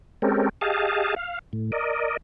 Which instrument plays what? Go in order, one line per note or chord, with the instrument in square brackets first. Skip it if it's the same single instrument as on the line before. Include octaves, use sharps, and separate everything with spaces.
[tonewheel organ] G#3 C4 C#4 G4 A4 A#4
G4 G#4 D#5 F5 A5
F5
A2
A#4 D5 D#5